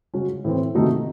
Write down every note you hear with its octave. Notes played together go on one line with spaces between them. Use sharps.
C#3 G#3 C#4 F#4
A2 E3 C4
C3 D#3 A3 D#4 F#4